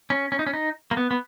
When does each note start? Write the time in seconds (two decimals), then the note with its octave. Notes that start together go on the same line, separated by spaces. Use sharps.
0.10 C#4
0.32 C#4
0.39 D#4
0.47 C#4
0.53 D#4
0.91 A#3
0.97 B3
1.11 B3